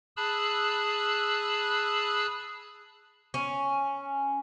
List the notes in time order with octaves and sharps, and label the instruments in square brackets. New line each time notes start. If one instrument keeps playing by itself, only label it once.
[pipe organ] G#4 A5 B5 E6 F#6
[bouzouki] C#4